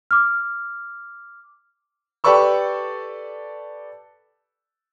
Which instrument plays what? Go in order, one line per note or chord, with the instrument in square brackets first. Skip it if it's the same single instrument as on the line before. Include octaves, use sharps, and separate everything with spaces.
[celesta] D6 F6
[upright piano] G4 A4 B4 D5 C#6 E6